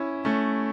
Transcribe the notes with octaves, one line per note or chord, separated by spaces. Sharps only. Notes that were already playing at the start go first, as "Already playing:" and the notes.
Already playing: C#4 E4
A3 C#4